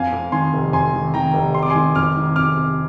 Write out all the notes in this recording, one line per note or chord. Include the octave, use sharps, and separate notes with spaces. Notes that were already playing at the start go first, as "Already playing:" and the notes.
Already playing: F2 F5 G#5
F2
D#3 G#5 C6
F1
F2 G#5 C6
D#3
D#3 G5 A#5
F1
C3 C6
D6
G#5 C6
D#3
F2 D6 F6
D#3
F2 D6 F6
C3